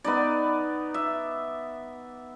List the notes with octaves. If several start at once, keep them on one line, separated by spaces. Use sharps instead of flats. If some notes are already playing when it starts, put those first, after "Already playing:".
B3 D#4 D5
E5